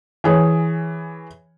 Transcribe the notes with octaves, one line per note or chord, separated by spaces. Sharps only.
E3 G#4 C#5